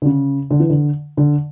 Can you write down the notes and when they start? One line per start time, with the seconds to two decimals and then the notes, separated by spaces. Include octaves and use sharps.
0.02 D3
0.05 C#3
0.50 D3
0.60 E3
0.70 D3
1.17 D3